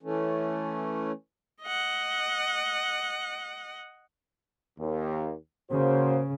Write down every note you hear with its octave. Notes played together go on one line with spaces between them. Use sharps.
E3 A3 C#4
D#5 F#5
D#2
C#3 A#3 F#4 C5